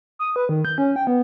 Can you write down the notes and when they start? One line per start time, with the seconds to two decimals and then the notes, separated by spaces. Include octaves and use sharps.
0.19 D#6
0.36 B4
0.49 D#3
0.65 G6
0.78 C#4
0.96 G5
1.07 B3